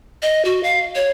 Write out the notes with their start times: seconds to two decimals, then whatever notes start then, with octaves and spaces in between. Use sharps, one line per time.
0.22 D#5
0.45 F#4
0.63 F5
0.95 C#5